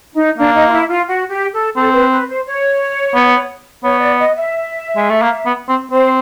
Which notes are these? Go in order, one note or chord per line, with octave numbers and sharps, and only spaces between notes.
D#4
A#3 D4
D#4
F4
E4
F4
F#4
G4
A4
C4 A4
B4
B4
C5
C#5
B3
B3 C#5
D5
D#5
E5
G#3
A3
A#3
B3
C4
C4 C5